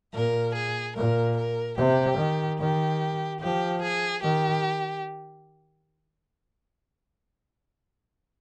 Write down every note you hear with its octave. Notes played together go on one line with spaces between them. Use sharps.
A#2 A#4
G#4
A#2 A#4
A#4
C3 G4
D#3
D#3 G4
F3 G4
G#4
D#3 G4